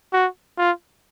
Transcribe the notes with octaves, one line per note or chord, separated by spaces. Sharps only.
F#4
F4